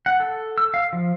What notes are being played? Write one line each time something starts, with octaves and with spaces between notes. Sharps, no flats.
F#5
A4
E6
F5
F3